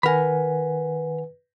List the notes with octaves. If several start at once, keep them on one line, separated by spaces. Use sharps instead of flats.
D#3 A#4 B4 F#5 G#5 B5